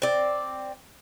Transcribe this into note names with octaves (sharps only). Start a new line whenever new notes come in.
C4 D5